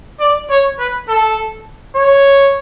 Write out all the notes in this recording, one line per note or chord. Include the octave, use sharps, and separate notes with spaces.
D5
C#5
B4
A4
C#5